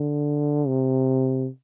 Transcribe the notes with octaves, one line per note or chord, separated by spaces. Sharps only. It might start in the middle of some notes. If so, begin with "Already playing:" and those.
Already playing: D3
C3